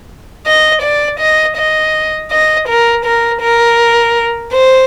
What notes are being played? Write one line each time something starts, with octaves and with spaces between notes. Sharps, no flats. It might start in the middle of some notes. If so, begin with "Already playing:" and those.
D#5
D5
D#5
D#5
D#5
A#4
A#4
A#4
C5